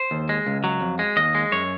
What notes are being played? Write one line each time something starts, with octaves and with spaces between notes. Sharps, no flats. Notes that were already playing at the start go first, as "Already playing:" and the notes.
Already playing: C5
D#2
G#3
C#2
F#3
F2
G#3
D#2 D#5
G#3
F#2 C#5